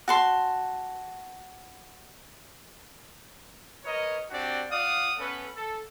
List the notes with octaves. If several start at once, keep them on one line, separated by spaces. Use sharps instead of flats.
F#4 A5 C6
A#4 B4 C#5 D#5
C4 D4 F#4 G4 D5
F4 D5 F5 F#5 D#6
B3 C#4 A4 B4
A4